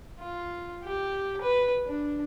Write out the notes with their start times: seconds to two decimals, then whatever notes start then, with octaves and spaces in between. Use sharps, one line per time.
0.20 F4
0.84 G4
1.41 B4
1.86 D4